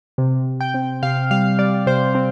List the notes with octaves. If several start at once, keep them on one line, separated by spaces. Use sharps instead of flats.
C3
C3
G5
C4
C3 F5
G3 F5
G3 D5
C3 C5
C4